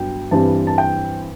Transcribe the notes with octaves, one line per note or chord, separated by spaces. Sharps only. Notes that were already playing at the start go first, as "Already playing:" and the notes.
Already playing: G2 F#3 B3 G5
G2 E3 G3 C4 A5
A5
G5